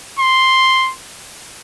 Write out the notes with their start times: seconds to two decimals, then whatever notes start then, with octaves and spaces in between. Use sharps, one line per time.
0.19 C6